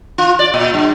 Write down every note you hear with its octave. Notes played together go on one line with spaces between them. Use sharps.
F4
D5
A#2
G2